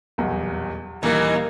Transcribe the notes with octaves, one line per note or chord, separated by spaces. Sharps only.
D#1 B1 E2
D#1 D#3 E3 A#3 D#4